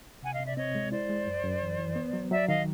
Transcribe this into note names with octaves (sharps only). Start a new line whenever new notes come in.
C3 F#5 G#5
D#5 F5
C3
D5 E5
C4 C#5 D#5
G#3
E4 C5 D5
G#3
F#2
F#2
E3
E3
B3
F#3
F#3 D5 E5
D#3 D#5 F5